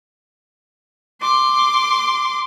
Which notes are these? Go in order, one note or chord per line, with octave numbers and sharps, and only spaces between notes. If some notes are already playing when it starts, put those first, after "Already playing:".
C6 D6